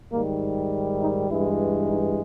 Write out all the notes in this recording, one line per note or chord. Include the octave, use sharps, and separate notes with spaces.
G#2 D#3 G3 A#3
D#4
G2 E3 G#3 E4
D#4